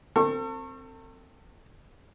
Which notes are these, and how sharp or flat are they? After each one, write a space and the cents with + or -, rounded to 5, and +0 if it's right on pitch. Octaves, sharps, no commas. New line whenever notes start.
C4 +0 A4 +40 C#6 -25